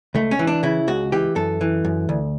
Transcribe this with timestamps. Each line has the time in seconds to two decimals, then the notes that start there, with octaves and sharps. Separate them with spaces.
0.15 C#2 A3
0.31 C#4
0.39 E3
0.47 D4
0.63 C#3 E4
0.88 C#2 F#4
1.12 E3 G4
1.36 F#2 A4
1.61 E3
1.85 F#2
2.09 D2